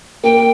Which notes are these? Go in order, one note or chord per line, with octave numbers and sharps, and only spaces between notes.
A#3 G5